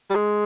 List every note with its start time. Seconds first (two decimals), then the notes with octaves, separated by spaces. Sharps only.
0.10 G3
0.15 G#3